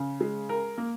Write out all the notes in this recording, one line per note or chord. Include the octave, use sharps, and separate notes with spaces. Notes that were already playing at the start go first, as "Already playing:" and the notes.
Already playing: C#3
G#3
A#4
A#3